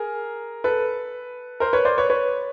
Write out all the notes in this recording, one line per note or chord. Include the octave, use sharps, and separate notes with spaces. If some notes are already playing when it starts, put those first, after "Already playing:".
Already playing: G#4 A#4
A4 B4
A#4 C5
B4 C#5
C5 D5
B4 C#5
B4 C#5